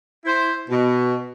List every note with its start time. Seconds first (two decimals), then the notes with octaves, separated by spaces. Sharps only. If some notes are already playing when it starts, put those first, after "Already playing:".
0.25 E4 C5
0.69 B2